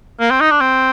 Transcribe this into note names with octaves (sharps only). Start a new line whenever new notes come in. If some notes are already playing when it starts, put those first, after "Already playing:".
A#3
C4
D#4
D4
C4